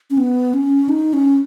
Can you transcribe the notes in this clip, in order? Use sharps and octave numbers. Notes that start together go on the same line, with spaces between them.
C#4
B3
C#4
D#4
C#4